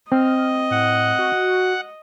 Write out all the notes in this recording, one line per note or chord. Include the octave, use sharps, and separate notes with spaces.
C4 D#5 F6
A2 F#5
F#4